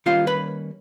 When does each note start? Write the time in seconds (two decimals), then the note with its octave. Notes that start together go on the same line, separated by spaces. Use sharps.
0.06 D#3 G3 A#3 C#4 F4 F5
0.27 B4 B5